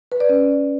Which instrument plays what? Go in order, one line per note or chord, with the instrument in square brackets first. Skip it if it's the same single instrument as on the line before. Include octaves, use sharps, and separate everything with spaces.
[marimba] B4
D5
C#4